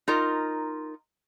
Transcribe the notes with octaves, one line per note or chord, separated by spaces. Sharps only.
D#4 F4 A#4